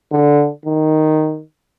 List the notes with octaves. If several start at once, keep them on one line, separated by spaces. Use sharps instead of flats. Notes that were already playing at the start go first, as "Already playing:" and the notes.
D3
D#3